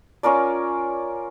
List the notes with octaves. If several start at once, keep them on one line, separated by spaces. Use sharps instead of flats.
C#4 F4 A#4 D5